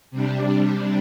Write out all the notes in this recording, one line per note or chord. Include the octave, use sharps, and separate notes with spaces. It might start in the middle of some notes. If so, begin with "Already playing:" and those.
C3 G3 D4